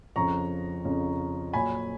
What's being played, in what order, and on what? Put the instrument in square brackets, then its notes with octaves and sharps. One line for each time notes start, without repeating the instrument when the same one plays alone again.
[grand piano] F2 C#3 F3 A#5 C#6
F2 C#3 F3
A#2 F#3 G#5 B5